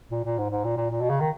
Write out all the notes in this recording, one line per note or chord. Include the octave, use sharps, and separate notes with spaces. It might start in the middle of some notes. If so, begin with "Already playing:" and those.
A#2
A#2
G#2
G#2
A#2
A#2
A#2
B2
C#3
D#3